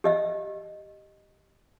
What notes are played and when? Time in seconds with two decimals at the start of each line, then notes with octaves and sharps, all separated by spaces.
0.04 G4 D#5 E5